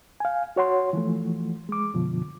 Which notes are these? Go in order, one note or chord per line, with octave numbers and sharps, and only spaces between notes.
F5 G#5
F#4 C#5 F#5 C6
E3 F3 A3
G#3 D6
F#2 B2 D3 F3